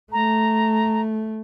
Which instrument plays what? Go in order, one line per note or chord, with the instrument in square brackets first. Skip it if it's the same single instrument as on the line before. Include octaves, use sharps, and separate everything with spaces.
[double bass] A3 [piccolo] A#5